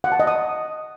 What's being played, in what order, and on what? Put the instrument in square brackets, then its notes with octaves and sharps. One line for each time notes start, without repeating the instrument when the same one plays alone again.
[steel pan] F#5
A5
D#5
D#6